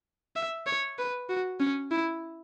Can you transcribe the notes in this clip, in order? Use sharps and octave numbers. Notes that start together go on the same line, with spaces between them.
E5
C#5
B4
F#4
C#4
E4